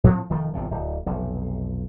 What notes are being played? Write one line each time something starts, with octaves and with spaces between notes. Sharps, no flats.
A2 F3 F#3 C4
F1 D#3 F3 A3
G1 E2 C3 F3
D1
F1 B1